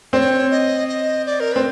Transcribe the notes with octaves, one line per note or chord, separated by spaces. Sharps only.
C4 C#5 D5
D#5
D#5
D5
A#4
C4 B4